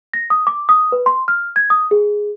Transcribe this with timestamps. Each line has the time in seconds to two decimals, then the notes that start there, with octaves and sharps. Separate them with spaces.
0.14 A#6
0.30 D#6
0.47 D6
0.69 D#6
0.92 B4
1.06 C6
1.28 F6
1.56 G#6
1.70 D#6
1.91 G#4